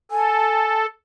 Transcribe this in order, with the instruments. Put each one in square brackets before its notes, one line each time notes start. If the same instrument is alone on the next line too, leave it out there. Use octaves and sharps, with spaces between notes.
[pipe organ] A4 [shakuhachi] G#5